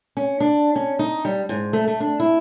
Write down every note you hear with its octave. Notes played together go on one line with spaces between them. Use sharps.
C#4
D4
C#4
D#4
G3
G#2
A3
A3
D4
E4